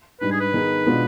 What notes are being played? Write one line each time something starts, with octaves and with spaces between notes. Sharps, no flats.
G#2 G3 D4 B4
G#4
B4
D#3 B3 D#4 G#4
B2 G#3 B3 D4 F4